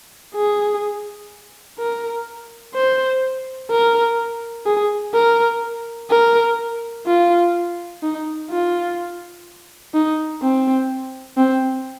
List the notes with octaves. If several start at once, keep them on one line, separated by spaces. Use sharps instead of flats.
G#4
A#4
C5
A#4
G#4
A#4
A#4
F4
D#4
F4
D#4
C4
C4